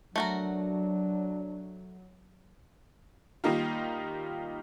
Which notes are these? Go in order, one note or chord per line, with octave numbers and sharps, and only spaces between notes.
F#3 A3 D4 F#4 A#4
D#3 G3 A#3 D#4 F4